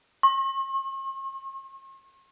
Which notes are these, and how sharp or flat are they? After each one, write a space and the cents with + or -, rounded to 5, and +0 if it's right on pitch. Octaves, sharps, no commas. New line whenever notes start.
C#6 -45